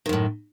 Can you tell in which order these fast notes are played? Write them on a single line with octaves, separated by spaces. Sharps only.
D#3 F#2 A2